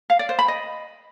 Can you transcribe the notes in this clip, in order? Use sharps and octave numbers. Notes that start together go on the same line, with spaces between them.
F5
D5
C5
B5
D#5